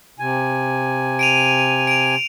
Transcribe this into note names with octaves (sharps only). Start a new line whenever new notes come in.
C3 G#5
D7 D#7 F7
D7 F7